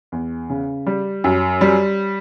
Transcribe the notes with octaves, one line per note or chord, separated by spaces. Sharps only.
E2
C#3
G3
F#2
G3